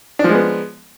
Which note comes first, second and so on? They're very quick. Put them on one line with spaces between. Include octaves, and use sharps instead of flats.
D4 F3 G#3 B3